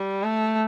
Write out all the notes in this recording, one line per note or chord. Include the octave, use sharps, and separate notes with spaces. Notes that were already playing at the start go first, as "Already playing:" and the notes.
Already playing: G3
A3